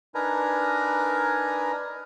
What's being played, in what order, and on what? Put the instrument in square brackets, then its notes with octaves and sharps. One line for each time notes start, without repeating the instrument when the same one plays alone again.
[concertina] D4 D#4 A#4 B4 G#5 A#5